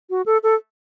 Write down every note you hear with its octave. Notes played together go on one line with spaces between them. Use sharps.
F#4
A4
A4